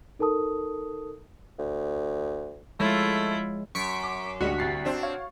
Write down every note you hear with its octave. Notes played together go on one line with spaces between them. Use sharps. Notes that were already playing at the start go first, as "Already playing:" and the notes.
D#4 A4 A#4 A5 D#6
D2
F3 G#3 A3 E4 F4 C#5
F#2 C#6 B6 D7
D6
A1 D2 G3 G#3 F#4 B6 C#7
C2 A6 C7
C4 D4
C#5 F5